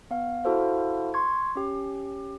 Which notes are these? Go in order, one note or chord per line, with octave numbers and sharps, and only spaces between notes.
B3 F5
E4 F#4 A4 C5 F5
C6 C#6 G#6
C#4 G4